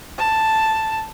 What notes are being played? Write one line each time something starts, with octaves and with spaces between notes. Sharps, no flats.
A5